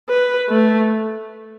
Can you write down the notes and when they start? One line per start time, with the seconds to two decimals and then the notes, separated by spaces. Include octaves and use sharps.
0.10 B4
0.50 A3